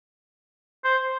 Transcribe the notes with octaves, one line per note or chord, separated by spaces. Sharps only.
C5